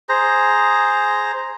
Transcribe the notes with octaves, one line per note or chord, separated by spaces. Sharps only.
G#4 C5 A#5